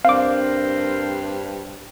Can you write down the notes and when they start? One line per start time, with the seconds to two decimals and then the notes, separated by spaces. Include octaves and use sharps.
0.05 G2 C4 D4 A#4 C5 F5 D6